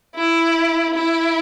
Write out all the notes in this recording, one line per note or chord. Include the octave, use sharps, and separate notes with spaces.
E4
E4